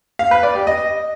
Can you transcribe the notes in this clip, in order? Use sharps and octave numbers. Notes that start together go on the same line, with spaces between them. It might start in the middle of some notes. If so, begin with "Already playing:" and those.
F5
B4
D5
G4
D#5